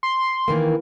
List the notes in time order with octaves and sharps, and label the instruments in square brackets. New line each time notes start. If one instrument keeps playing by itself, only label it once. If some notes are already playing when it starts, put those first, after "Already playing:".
[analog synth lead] C6
[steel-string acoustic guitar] D#3 E3 A#3